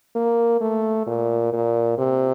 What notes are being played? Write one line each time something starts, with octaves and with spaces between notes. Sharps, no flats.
A#3
A3
A#2
A#2
C3